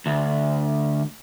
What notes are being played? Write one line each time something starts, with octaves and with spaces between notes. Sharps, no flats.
D2